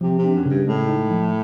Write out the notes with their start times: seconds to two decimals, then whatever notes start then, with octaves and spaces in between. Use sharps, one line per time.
0.01 C3 F3
0.19 C3
0.24 D4
0.35 F#2
0.46 G2 C#3
0.67 A2 G#3
0.89 D#4
1.10 F3